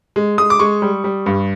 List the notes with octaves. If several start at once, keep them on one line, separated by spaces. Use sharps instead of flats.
G#3
G#3 D#6
D6
G#3 C#6
G3
G3
G2